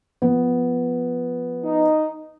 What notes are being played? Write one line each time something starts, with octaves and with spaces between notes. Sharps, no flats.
F3 B3
D#4